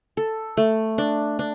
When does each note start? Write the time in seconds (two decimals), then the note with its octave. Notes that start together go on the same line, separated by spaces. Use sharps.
0.17 A4
0.57 A3
0.98 D4
1.39 D4